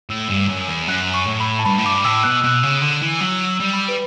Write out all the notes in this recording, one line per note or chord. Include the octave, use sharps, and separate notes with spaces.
A2 E6
G2
F#2
E2
F#2 F#6
C#6
A2
B5
A5
G2 B5
A2
G2 D6
A2 E6
B2 F#6
E6
B2 F#6
C#3
D3
E3
F#3 E6
E6
G3
B5
B4